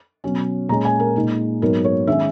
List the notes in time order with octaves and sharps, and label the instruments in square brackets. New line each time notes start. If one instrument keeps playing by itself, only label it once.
[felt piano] B2 F#3 C#4
A#2 G#3 C#4 A#5
G#5
A#4
A#2 G#3 D#4
G#2 F#3 B3 A#4
C#5
D#3 G#3 C#4 E5